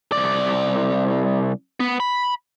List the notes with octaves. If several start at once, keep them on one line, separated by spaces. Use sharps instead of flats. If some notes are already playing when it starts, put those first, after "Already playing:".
C2 D5
B3
B5